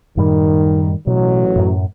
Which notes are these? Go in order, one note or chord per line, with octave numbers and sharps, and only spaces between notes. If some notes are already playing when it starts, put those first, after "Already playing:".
F#2 A2 D#3 G3
A1 B2 F#3
F#2 A2